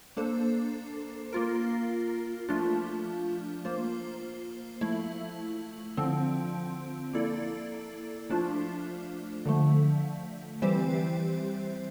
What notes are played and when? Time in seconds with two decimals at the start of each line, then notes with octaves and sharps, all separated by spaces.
0.17 A#3 D4 A4 C5
1.33 A#3 F4 A#4
2.49 F3 A3 D4 F4
3.65 A#3 F4 C5
4.81 F3 A3 E4
5.97 D3 F3 C4
7.13 A#3 E4 A4 D5
8.30 F3 A3 D4 F4 C5
9.46 D3 F3 A3
10.62 E3 G3 C4 G4 C5